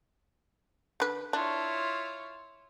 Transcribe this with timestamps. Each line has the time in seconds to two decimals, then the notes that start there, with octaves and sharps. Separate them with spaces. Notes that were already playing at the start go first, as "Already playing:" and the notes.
1.00 D3 B4
1.33 D4 E4 F4 C#5